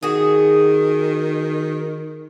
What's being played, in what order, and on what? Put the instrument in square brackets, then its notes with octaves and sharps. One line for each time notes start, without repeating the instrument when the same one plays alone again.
[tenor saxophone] D#3 [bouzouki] F#4 G#4